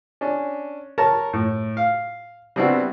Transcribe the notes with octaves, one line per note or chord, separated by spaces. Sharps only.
C#4 D4
A#4 C#5 A5 A#5
A2
F5
G3 B3 C4 D4 E4 F#4